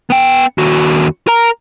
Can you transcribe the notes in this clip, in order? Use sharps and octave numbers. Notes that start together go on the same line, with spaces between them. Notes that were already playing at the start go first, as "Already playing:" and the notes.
B3 G5
D#2 F#4
A#4 A#5